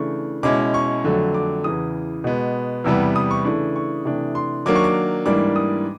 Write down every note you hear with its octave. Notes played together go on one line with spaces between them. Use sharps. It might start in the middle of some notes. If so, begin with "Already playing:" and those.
Already playing: C#3 E3 A3 D4 C#6
B2 G#3 C#4 E4 D6
C#6
F2 D3 F#3 A3
D6
E2 C#3 E3 D#6
B2 G#3 B3
E2 C3 E3 G3 B3 E6
D#6
C#6
C#3 E3 A3 D4 C#6
C#6
C3 E3 A3 D4
C6
D#3 F#3 A#3 D4 D6
C#6
D6
G#2 E3 G3 A#3 D4 D6
D#6